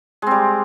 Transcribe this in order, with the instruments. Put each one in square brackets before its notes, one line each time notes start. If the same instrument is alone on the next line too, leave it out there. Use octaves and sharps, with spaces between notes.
[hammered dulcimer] G#3
C4
G3